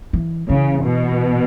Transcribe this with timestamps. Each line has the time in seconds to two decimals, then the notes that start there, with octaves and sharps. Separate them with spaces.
0.13 E3
0.49 C#3 E3
0.85 B2